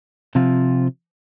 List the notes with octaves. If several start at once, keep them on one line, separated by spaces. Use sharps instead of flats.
C3 F3 C4 F4